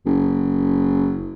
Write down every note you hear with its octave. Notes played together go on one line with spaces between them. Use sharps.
F#1